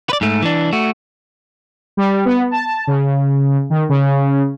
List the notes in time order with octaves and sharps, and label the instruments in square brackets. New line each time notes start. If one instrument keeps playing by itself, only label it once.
[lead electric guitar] B4 D5
G#2 A3
E3 D4
A3 F#4
[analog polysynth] G3
B3
A5
C#3
D#3
C#3